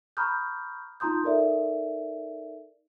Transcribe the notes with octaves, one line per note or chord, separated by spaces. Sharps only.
A#5 B5 C#6 D#6 F6 G6
D#4 F4 A#5 C6 D#6 G6
D#4 A4 A#4 D5 E5